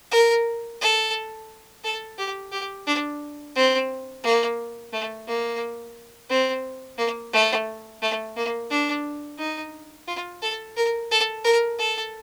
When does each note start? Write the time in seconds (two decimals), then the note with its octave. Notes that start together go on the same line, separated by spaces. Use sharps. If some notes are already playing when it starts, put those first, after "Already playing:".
0.11 A#4
0.81 A4
1.84 A4
2.18 G4
2.52 G4
2.86 D4
3.56 C4
4.23 A#3
4.92 A3
5.27 A#3
6.30 C4
6.98 A#3
7.33 A3
8.02 A3
8.36 A#3
8.70 D4
9.38 D#4
10.07 F4
10.42 A4
10.77 A#4
11.11 A4
11.44 A#4
11.79 A4